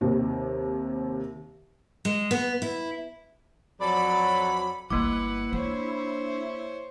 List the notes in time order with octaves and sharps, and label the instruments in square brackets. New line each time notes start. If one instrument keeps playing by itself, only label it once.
[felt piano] D#2 C3 D#3
[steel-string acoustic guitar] G#3
B3
E4
[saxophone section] F2 A4 D5 [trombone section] F#3 [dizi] B5
[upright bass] G1 D2 [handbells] A#3 D6 [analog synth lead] E4 [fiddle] B4 F#5
[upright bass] D4 [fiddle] C5 C#5